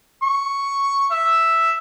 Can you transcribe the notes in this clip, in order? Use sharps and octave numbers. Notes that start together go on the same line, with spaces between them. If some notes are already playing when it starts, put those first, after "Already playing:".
C#6
E5